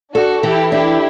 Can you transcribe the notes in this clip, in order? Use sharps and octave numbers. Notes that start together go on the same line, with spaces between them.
D4 F#4 A4
E3 E4 G4
D4 E4 G4